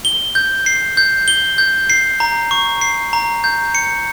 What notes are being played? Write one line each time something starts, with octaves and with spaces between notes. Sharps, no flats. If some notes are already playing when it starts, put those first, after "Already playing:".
G7
G6
C7
G6
G7
G6
C7
A#5
C#6
C7
A#5
G6
C#7